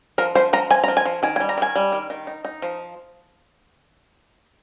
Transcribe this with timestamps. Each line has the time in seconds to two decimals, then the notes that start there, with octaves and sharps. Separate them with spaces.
0.18 F3 A#4
0.35 F3 C5
0.53 F3 A#5
0.70 F3 G#5
0.84 A#5
0.88 F3
0.97 G#5
1.05 F3
1.23 D#3 G#5
1.36 G#5
1.40 G3
1.49 A#5
1.58 D#3 G#5
1.76 G3
1.92 D#3
2.10 D#3
2.27 D#4
2.45 D#4
2.62 F3